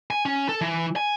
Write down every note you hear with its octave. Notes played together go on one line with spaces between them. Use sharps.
G#5
C#4
A4
E3
G#5